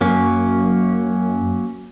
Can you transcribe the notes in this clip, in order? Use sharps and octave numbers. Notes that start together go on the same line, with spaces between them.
F#2 F#3 A#3 C#4